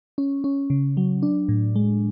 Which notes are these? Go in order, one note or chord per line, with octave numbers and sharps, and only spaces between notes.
C#4
C#4
C#3
F#3
D4
A2
G#3